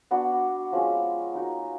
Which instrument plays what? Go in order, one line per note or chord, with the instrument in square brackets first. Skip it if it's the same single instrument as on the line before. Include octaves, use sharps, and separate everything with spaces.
[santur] B3 D4 F#4
F3 G#3 C#4
A#3 D#4 F#4